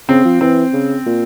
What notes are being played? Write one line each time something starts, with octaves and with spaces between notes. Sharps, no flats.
C#3 C4
F3
E3 C4
C#3
A#2